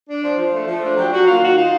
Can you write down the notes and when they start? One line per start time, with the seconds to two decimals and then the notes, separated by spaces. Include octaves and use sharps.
0.08 D4
0.23 F3
0.37 F3
0.52 A3
0.68 F3
0.81 D4
0.96 F#3 G4
1.11 F#3 F#4
1.26 A#3 F4
1.41 D#3 F#4
1.55 D#4 F4